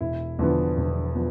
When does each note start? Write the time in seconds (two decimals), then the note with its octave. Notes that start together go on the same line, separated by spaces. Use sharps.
0.01 E1 E4
0.39 E2 D3 F3 B3
0.77 E1
1.15 F3 B3